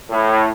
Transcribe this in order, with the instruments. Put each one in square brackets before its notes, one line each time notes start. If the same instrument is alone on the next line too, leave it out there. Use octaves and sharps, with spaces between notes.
[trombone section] A2